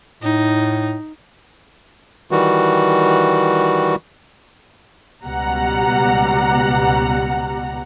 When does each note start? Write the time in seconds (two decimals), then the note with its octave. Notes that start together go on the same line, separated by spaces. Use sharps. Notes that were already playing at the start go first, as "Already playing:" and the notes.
0.23 A2 D#4
2.31 D#3 E3 G3 F#4
5.25 C#2 B2 G3 F#5 A#5